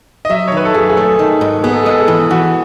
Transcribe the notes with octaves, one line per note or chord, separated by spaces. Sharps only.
D#5
F#3 E5
C#5
D#3 B4
A4
F#2 G#4
G#4
A3 A4
D#3
G#2
B3 G#4
A4
G#4
G#3 A4
G#4
E3
E3 F#4